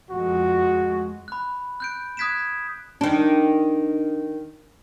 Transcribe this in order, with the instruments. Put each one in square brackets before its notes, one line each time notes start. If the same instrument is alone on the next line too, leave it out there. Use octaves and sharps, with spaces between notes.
[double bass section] F2 G#3 [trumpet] F#4
[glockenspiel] B5 F#6
F#6 G6 D7
D#6 F#6 G#6 B6 D7 E7
[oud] D#3 D4